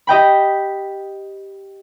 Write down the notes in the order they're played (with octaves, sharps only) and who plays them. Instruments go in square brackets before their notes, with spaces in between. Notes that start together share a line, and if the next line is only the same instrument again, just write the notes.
[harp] G4 D#5 G5 B5